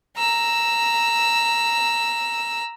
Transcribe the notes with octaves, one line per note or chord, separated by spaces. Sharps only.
A#5 E6